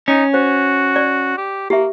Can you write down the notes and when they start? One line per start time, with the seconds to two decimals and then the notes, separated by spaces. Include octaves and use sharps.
0.08 C#4 D#4
0.34 F#4 C5
0.96 D5
1.38 G4
1.70 A#3 G4 E5